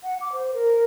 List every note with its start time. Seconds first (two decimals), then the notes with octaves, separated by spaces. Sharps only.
0.03 F#5
0.21 D6
0.33 C5
0.54 A#4